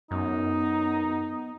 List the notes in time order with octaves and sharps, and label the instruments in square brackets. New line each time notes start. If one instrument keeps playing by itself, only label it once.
[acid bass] F#2 [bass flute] B3 [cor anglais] D#4